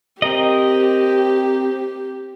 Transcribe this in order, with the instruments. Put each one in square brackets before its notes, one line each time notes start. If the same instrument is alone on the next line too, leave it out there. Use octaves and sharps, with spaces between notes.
[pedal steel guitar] C4 A#4 D#5 [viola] G4